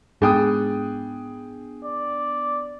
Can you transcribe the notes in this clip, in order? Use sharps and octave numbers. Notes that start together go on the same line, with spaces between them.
G#2 B3 D4 G#4 G5 D#6
D5